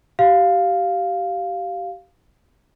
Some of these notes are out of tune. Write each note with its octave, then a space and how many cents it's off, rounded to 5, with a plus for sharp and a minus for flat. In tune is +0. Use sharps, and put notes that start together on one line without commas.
G4 -30 F5 +0